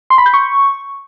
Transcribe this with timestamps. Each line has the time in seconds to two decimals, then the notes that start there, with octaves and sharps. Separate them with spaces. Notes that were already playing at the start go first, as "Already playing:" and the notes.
0.10 C6
0.18 B5
0.26 G6
0.34 C#6